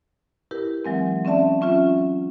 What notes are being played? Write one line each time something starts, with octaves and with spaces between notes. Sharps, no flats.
E4 G4 A#4 B4
E3 F#3 G#3 C4
C4 C#4 D5 E5 A5
F#3 C#4 F4 E5